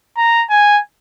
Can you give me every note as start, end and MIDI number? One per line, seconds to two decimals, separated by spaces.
0.17 0.44 82
0.50 0.79 80